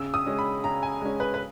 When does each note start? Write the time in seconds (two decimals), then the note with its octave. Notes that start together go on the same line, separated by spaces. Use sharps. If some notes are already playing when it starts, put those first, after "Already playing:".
Already playing: C#3 E6
0.14 D#6
0.26 G#3 C#4
0.39 B5
0.64 C#3 A#5
0.83 G#5
1.01 G#3 C#4
1.20 B4
1.34 B4